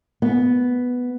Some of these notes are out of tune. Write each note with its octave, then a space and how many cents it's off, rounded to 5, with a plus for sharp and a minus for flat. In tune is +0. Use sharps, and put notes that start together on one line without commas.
B3 +0